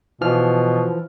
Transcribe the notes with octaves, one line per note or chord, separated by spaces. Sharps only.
B2 E3 F3 F6